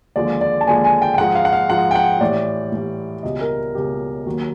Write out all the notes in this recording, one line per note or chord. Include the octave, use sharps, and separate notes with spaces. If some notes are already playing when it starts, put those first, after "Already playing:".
D#2 D3 F3 G#3 D5
D5
A5
D#2 D3 F3 G#3 G#5
G#5
G5
G5
G#2 F3 G#3 F#5
F5
F#5
F5
G#2 F3 G#3 F#5
G5
F#5
A2 E3 G3 D5
A2 E3 G3
C#2 B2 G3 D#5
A#4
C#2 B2 G3 G4
D#2 D#3 F#3